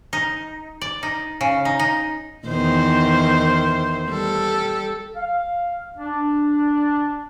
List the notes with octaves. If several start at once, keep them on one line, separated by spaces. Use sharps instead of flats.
D#4
D5
D#4
C#3
D#4
D#4
E2 D#3 C5
G3 A4
F5
D4